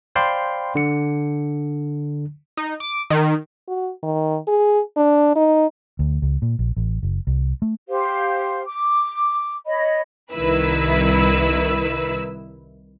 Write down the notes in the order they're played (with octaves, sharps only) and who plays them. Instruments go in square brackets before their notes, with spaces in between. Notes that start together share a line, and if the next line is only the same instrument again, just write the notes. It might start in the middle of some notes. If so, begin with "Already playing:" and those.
[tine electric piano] C5 D5 F5 G5 B5 C6
D3 C#7
[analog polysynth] D#4
D6
D#3
[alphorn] F#4
D#3
G#4
D4
D#4
[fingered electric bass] D2
C#2
A#2
A#1
A1
F#1
C2
A3
[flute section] G4 C5 F5
D6
C#5 D#5 B5
[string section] C2 D#3 E4 B4 E6